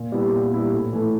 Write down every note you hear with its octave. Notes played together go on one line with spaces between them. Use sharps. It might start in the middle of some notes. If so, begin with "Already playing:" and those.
Already playing: A#2
G3 B3 E4
A#2
G3 B3 E4
A2
E3 A3